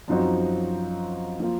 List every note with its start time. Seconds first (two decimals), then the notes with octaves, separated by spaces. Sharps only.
0.08 F#2 F3 C4 D#4 F#4
1.40 F3 A#3 F4